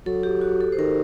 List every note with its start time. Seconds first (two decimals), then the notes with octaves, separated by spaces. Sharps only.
0.06 F#3 A4
0.23 G4
0.41 F#4
0.61 A4
0.72 C5
0.79 D#3 A#4